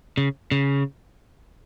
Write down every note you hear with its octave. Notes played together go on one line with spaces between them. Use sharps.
C#3
C#3